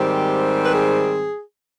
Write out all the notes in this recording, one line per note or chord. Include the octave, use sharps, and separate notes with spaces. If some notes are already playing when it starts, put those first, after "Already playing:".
Already playing: G#2 D#3 G3 C4 G4
B4
G#4